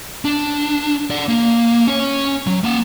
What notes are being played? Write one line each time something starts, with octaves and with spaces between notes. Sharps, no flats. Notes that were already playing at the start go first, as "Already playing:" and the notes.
D4
D5 F#5
A#3
C#4 C#5
F#3
A#3 F#5